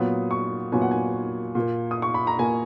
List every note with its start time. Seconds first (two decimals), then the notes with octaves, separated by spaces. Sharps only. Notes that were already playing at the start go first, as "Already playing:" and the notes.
Already playing: A#2 F#3 B3 D#6
0.31 C#6
0.72 A#2 F#3 B3 G#5
0.82 F#5
0.91 G#5
1.55 A#2 A#3
1.91 D#6
2.02 C#6
2.14 B5
2.27 A#5
2.39 A#2 A#3 G#5